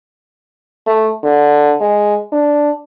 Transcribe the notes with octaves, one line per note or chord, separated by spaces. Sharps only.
A3
D3
G#3
D4